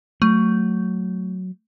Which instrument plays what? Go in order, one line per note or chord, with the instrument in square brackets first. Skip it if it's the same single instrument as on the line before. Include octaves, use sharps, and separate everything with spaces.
[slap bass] F#3 [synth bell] A3